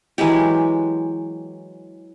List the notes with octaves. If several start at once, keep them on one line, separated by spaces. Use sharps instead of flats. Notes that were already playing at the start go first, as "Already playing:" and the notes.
E3 F#3 G#3 G4